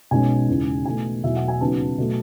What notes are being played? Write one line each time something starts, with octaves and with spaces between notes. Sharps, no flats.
B1 B2 G#3 C#4 G#5
E1 E2 C#3
E2 B2 A3 G#5
E2 B2 F#3 A3 E5
F#5
G#5
D#2 C#3 F#3 B3 A5
B2 F#3 A3